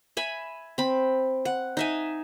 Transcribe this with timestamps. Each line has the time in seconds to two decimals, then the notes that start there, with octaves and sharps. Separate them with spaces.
0.17 E5 G#5 B5
0.78 C4 B5
1.45 F#5
1.77 D#4 E5 G#5